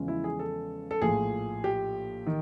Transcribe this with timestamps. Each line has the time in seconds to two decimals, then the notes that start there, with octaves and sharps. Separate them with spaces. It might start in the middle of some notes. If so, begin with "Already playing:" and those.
Already playing: E2 C#3 F3 G#3 C#4
0.08 E4
0.24 G#4
0.39 A4
0.91 A4
1.02 A#1 A2 F3 G#4
1.64 G4
2.27 D#3